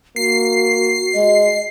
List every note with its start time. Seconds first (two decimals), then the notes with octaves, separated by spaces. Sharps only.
0.16 A#3 F#4 C7
1.15 G#3 D#5